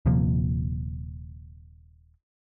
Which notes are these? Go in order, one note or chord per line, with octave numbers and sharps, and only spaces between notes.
D#1 C3 F3 A#3